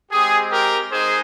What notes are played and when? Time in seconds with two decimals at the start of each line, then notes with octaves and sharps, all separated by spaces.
0.11 G#3 C4 G4 G#4
0.52 G4 A#4
0.92 G#3 D#4 G#4 C5